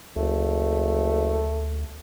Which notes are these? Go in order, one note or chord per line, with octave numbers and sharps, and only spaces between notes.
F#1 D2 A3